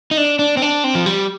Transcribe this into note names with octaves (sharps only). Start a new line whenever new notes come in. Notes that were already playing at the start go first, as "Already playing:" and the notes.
D#4
D4
D4
C4
D4
C4
F3
G3